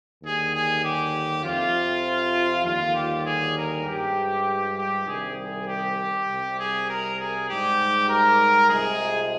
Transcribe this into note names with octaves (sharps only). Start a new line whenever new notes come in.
D#2 D3 G3 G#4
G#4
G4
F2 C3 F3 F4
D#2 D3 G3 F4
G4
G#4
A#4
G2 F3 G#3 G4
G4
C2 C3 D#3 G3 G#4
G#4
G4
C2 C3 G3
G#4
A#4
G#4
G#2 G3 G4
A#4
C2 C3 F3 G#3 G#4